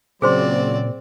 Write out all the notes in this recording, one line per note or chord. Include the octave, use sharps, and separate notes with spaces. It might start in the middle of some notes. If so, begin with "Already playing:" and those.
A#2 C#3 F#3 C4 G#4 C5 D5 C6